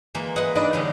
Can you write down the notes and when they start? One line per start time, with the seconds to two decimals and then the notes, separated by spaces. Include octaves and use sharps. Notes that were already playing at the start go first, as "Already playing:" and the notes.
0.15 E3 G#3 A#3
0.36 B4 D#5 F#5
0.56 D4 D#4 B4 D#5
0.73 A2 D3 E3 G3